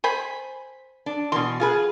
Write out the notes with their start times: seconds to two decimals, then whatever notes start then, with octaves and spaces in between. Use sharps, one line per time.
0.04 C5 G#5 B5
1.06 D4
1.32 B2 E3 C6
1.60 F4 G#4 B4